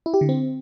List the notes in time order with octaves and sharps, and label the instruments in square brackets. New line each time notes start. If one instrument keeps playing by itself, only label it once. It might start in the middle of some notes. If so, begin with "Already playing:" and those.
[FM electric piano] E4
G4
D3
C4